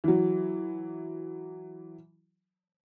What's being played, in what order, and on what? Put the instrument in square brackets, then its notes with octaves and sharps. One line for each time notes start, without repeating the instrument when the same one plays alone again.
[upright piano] E3 F#3